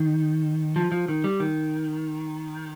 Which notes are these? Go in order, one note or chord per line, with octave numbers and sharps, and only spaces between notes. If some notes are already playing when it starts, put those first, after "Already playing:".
Already playing: D#3
F3
F3
D#3
G3
D#3